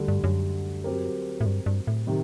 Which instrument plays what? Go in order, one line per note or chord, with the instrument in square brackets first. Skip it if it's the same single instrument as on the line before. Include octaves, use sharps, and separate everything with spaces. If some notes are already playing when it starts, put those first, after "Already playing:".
Already playing: [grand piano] D2 D3 G3
[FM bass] G2
F#2
[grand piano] F#3 C4 G4 A#4
[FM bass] A2
G2
G2
A2
[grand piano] C3 D#3